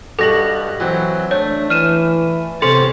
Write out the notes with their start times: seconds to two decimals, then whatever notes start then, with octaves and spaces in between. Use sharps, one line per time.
0.19 G2 B2 A4 C#6 A#6 F#7
0.80 E3 F#3 C4
1.31 A3 D4 C#5
1.70 E3 F6 D#7 E7
2.62 C3 C#4 A4 C5 C6 A6 C#7